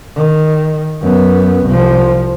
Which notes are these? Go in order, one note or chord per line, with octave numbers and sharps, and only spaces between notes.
D#3
F#2 B3
C2 F3